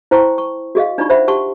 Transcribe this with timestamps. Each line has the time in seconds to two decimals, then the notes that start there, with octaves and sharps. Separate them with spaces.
0.11 E4 C5 G5 A5 C6 C#6
0.38 C#6
0.75 F#4 G#4 D#5 F5
0.98 D4 D#4 F4 D5 B5 C#6
1.10 C5 E5 F#5 B5
1.28 G4 F#5 A5 C6 C#6